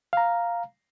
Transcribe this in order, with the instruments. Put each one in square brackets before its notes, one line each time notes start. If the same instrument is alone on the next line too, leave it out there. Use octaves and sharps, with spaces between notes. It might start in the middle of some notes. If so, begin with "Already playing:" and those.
[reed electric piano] F5 A#5